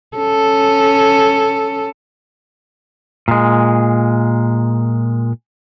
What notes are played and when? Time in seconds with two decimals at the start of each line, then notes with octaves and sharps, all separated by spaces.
0.17 C#4 A4
3.28 A#2 G#3